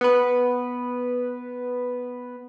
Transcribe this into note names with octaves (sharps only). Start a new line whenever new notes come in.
B3 B4